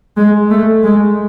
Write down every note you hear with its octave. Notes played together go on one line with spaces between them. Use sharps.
G#3
A3
G#3